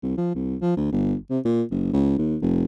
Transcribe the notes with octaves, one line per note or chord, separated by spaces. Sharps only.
C2
F3
C2
F3
D2
G1
C3
A#2
F#1
C#2
D#2
F1